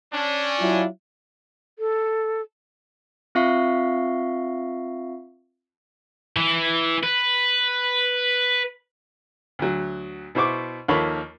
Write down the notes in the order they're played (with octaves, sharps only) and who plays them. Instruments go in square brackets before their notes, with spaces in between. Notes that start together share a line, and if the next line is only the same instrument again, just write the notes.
[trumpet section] C#4 D4
[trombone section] F#3 E4 F4
[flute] A4
[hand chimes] C4 F4 E5 F5 C#6 C7
[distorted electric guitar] E3
B4
[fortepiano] D2 F#3
B2 E4 C5 C#6 D6
D#2 F3 A#3 A4 C#5 B5